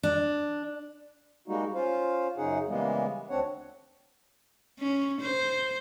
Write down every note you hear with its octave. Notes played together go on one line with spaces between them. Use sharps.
D4
G3 G#3 A#3 D#4 F#4
C#4 F4 C5 F5
F#2 C#3 C#4 D#4 G#4 F#5
C#3 E3 G3 G#3 A#3 B3
D2 C4 D4 C#5 F#5
C#4
C5